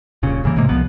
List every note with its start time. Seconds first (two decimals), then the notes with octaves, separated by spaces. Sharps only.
0.23 D#1 A#2 C#3
0.44 G1 C#3 E3 A#3
0.56 G#1 C3 G#3 A#3
0.69 C2 F2 F3 B3